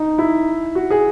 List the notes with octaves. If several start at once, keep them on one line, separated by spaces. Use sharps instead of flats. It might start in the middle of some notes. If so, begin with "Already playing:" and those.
Already playing: D#4
E4
F#4
G#4